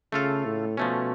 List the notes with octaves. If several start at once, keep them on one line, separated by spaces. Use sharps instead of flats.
C#3 A3 F4 A4 F5
A2
B2 F3 A3 C#4